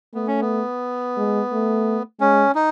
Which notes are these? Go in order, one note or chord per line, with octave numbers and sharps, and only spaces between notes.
A3 B3
C#4
B3
G#3
A3
G#3 C#4
D#4